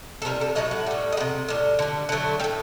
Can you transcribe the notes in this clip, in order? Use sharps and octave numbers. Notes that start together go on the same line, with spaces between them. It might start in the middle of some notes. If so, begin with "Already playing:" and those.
A4
C3 G3 A#4
A4
A2 F#3 A3 D#5
F#5
A2 G3
D#5
G3 F#5
C3
A2 G3
D3 G3
D3 F#3 A3
G3 G5
A2